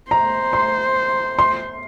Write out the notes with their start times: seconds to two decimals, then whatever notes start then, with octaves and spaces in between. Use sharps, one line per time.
0.11 C5 A#5
0.53 C6
1.39 C6